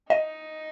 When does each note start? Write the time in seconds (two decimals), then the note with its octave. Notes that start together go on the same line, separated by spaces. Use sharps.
0.10 D#4 D#5